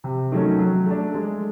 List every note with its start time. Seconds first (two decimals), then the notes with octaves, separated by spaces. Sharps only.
0.04 C3
0.32 D#3 F#3 A3 C#4
0.59 F#3
0.86 A3 D4
1.14 G#3